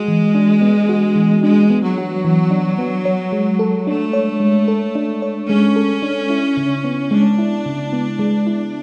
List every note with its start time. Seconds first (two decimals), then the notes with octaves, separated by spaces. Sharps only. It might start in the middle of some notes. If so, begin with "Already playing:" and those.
Already playing: G#3 F#4
0.08 E3
0.35 D4
0.61 B3
0.89 F#4
1.16 E3
1.43 G#3 D4
1.70 B3
1.83 F#3
1.98 F#4
2.25 E3
2.51 D4
2.78 B3
3.05 C#5
3.32 G#3
3.59 A4
3.87 A3 D4
4.13 C#5
4.40 G#3
4.68 A4
4.95 D4
5.22 C#5
5.48 G#3 C#4
5.76 A4
6.02 D4
6.30 E4
6.57 C#3
6.85 B3
7.11 G#3 D4
7.38 E4
7.66 C#3
7.93 B3
8.19 G#3
8.47 E4